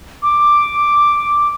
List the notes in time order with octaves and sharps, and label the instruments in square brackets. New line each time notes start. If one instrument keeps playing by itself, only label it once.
[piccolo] D6